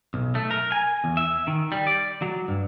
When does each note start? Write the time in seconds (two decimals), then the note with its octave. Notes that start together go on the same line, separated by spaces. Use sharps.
0.14 B1
0.35 A3
0.51 A#4
0.72 G#5
1.04 E2
1.17 E5
1.47 D#3
1.72 G3
1.87 D5
2.22 F#3
2.48 G2